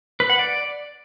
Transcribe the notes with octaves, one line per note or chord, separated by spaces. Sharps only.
B4
F#5
D5